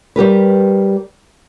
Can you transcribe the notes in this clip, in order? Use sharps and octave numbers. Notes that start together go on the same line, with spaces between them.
G3 G4 A#4 B4